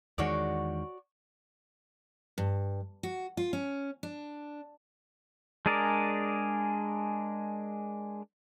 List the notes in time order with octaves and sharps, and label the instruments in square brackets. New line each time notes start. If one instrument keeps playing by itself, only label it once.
[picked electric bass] E2 D#3 G#3 [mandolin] F#4 C#5 D5
[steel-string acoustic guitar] G2
F#4
F4
C#4
D4
[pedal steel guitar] G#3 D4 G#4 A#4 D5